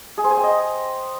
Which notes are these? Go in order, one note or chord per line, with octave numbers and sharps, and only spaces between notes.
G#4
C5
G#5
G5
D#5